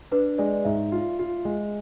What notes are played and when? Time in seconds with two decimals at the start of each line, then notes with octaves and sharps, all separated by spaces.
0.12 D4 B4
0.38 G#3 D5
0.65 G#2 E5
0.92 F4
1.19 F4
1.45 G#3